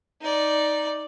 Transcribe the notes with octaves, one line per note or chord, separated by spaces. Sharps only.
D#4 D5